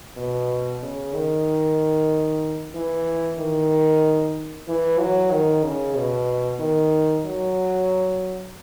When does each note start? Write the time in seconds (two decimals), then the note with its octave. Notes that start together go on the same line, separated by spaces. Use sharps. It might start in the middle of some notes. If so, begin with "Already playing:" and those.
0.17 B2
0.82 C#3
1.14 D#3
2.74 E3
3.39 D#3
4.68 E3
5.00 F#3
5.31 D#3
5.64 C#3
5.96 B2
6.60 D#3
7.25 F#3